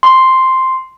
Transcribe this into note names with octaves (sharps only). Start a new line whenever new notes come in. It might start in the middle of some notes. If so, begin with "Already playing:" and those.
C6